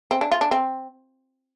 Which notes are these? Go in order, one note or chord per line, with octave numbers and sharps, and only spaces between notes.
C4
D4
F4
D4
C4